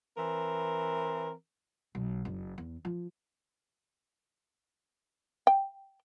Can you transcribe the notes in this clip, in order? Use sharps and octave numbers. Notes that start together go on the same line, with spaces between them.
E3 C4 A#4
B1
F#1
E2
F3
G5